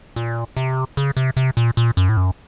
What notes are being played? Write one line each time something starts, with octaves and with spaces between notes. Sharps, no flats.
A#2
C3
C#3
C3
C3
A#2
A#2
F#2
A2
F#2